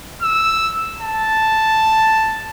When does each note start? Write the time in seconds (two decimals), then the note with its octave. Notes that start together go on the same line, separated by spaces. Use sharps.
0.23 E6
1.01 A5